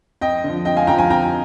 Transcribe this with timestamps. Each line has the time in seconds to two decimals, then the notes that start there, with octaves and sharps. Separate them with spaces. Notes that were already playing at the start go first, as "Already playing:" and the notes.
0.21 F2 D#5 G5
0.44 D3 F3
0.65 F2 D#5 G5
0.76 F5 G#5
0.87 D3 F3 G5 A#5
0.98 F5 G#5
1.10 F2 G5 A#5